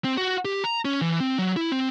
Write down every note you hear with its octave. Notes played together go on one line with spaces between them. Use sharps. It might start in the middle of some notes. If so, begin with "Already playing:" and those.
C4
F#4
G4
A#5
C#4
E3
C4
F#3
E4
C4